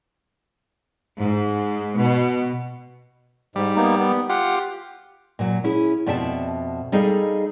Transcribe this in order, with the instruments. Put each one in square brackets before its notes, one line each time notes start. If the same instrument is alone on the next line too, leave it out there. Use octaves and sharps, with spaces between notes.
[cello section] G#2
B2
[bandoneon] G#2 [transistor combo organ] G3
[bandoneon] A#3 B3 D#4
B3
[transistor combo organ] F4 G4 [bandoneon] F#5
[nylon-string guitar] A#2 F#3
C#4 E4 G#4
F2 B2 D5 E5 G5 A5
G3 D#4 G#4 A4 D#5 F5